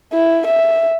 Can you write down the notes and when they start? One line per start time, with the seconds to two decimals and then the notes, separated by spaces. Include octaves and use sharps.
0.13 E4
0.47 E5